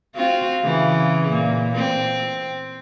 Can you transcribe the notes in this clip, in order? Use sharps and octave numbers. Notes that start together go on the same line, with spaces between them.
C4 F4 F#4
C#3 E3
A#2
C4